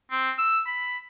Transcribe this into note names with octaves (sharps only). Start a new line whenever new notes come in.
C4
E6
B5